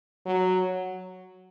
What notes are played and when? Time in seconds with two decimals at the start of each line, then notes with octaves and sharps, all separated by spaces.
0.26 F#3